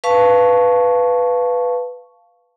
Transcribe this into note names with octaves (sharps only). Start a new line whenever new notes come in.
B4 F5 A5 C#6